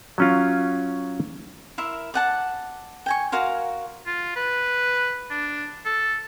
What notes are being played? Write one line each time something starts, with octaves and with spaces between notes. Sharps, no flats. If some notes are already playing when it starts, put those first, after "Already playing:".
F#3 C#4 F4
E4 A#4 E5 C6
D5 F#5 A5
G5 G#5 C#6
F#4 A#4 F5 C6
F4
B4
D4
A4